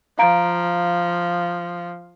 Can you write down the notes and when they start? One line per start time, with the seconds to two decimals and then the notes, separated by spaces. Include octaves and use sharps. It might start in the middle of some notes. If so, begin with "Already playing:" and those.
0.19 F3 F5 A#5 D7